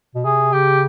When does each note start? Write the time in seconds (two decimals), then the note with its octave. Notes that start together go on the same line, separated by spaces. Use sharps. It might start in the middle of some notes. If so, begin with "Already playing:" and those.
0.15 B2
0.25 C3 G#4
0.53 C#3 G4